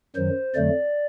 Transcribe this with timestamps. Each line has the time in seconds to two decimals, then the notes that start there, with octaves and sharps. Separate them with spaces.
0.16 F#2 D#3 F#3 C5
0.55 F2 D3 F#3 A3 D5